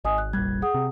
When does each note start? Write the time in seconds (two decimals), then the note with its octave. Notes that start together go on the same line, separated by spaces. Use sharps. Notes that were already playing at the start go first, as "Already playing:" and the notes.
0.05 G#1 D#5 G#5 D#6
0.18 F#6
0.33 F1 A#1 G3 F#6 G#6
0.62 G#4 F#5 D#6
0.74 C3